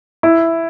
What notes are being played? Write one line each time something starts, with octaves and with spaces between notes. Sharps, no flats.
E4